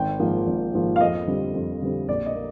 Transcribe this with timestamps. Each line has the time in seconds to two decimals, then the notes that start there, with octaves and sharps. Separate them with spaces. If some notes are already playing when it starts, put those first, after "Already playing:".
Already playing: G#1 G5
0.19 G#2 F3 A#3
0.47 G#1
0.73 G#2 F3 A#3
0.96 F5
1.01 F2 D#5
1.27 D3 G3 C4
1.54 F2
1.81 D3 G3 C4
2.08 A#1 D5
2.26 D#5
2.35 A#3